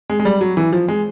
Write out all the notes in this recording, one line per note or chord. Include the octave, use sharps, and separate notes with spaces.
G#3
G#3
G3
F#3
E3
F3
G#3